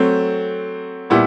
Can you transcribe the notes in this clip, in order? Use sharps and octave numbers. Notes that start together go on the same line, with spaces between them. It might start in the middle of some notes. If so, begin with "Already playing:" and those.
Already playing: F#3 A3 C4
A#2 G3 B3 E4